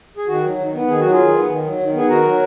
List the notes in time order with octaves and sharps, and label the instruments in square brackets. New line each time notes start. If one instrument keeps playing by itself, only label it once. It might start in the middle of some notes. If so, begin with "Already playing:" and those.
[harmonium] G#4
D#3 F#4
F#3
D#3
B3
D#3 G#4
F#3 F#4
F4 G#4
D#3
B3
D#3
F#3
D#3
B3
G#4
D#3 F#4 A#4
F#3